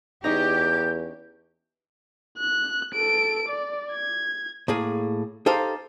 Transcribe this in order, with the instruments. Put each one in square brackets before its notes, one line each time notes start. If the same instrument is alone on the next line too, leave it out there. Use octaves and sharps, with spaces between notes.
[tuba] E2 [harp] C#4 D#4 A#5 [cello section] G4 [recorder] G6
[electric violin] F#6
A4 D7
D5
G#6
[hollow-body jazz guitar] A2 A#3 G#4
D#4 G4 A4 C5 F5